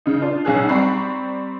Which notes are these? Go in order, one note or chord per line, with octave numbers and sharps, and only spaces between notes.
C#3 D#4
D4 F4
B1 C#4 G#4 F#6
G3 C4 A#5 B5 C#6 C7